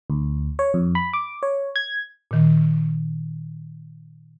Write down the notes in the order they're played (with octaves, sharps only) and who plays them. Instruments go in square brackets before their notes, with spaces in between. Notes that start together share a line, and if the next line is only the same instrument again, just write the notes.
[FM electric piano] D2
C#5
F2
B5
D6
C#5
G#6
[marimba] A#2 D#3